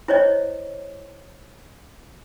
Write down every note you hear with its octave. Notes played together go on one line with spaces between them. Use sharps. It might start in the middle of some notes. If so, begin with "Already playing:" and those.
E4 C5 C#5 D#5